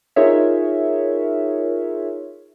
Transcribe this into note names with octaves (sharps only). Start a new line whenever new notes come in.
D#4 F4 G#4 A#4 C#5 E5